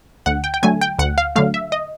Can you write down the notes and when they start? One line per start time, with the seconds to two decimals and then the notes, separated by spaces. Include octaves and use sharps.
0.26 D2 F#5
0.44 G5
0.54 G5
0.63 D3 F#3 A3 G#5
0.81 G5
0.99 D2 F#5
1.18 F5
1.36 D3 F#3 A3 F5
1.54 E5
1.72 D#5